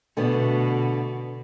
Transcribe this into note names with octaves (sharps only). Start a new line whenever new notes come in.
B2 D3 A3 B3